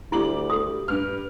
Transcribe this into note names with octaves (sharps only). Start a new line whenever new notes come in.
D2 G3 E4 D6 F#7
A4 D#6
G2 B4 F6